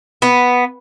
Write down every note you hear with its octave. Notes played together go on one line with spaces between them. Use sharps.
B3